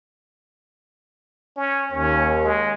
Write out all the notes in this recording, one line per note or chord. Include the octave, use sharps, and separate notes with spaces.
C#4
D#2 C#4
G#3